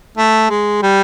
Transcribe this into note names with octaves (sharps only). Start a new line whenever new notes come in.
A3
G#3
G3